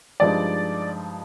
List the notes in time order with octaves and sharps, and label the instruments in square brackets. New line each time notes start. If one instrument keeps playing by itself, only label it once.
[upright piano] G2 F3 G#3 D#4 D5